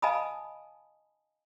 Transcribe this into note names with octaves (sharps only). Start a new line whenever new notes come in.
D#5 F5 G#5 A5 B5 D#6